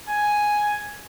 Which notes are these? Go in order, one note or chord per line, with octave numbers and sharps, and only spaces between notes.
G#5